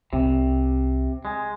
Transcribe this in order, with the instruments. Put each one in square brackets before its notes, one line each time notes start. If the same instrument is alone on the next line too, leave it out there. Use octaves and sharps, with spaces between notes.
[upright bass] C2 [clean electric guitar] C3
[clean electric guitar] G#3